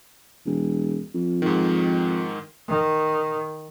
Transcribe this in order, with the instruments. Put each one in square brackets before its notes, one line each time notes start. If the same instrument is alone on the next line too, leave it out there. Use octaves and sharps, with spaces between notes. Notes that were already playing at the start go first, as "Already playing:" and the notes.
[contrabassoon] E1
F2
[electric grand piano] G#2 D#3
[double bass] D#3